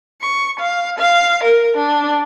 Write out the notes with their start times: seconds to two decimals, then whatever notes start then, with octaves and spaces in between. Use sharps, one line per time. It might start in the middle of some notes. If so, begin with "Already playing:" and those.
0.20 C#6
0.60 F5
0.98 F5
1.43 A#4
1.77 D4